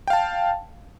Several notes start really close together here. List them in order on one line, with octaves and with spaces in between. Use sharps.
G5 F5 A5